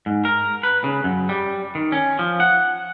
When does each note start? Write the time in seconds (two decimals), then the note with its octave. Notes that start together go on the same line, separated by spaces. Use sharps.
0.06 G#2
0.25 A#4
0.63 B4
0.84 C#3
1.04 F#2
1.29 G3
1.75 D#3
1.92 C#4
2.19 F3
2.40 F#5